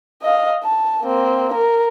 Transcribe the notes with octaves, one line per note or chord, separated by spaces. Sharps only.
D#5 F5
A5
A#3 C4
A#4